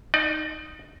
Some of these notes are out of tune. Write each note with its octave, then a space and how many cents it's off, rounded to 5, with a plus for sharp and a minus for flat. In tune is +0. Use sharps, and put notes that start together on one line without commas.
D#4 +0 D5 +35